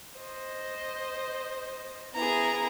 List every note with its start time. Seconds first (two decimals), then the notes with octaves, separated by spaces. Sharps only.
0.20 C5 D#5
2.15 B3 E4 G#4 A#5